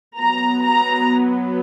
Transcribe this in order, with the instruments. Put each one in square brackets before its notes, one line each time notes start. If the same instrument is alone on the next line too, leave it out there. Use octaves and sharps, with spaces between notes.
[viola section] F#3 B3 A#5
A#5